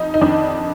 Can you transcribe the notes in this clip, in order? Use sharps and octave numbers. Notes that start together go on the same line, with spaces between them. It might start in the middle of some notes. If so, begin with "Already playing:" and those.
Already playing: F2 D#4
D#4
F2 D#3 D4